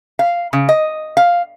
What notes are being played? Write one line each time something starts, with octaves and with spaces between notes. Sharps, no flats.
F5
C#3
D#5
F5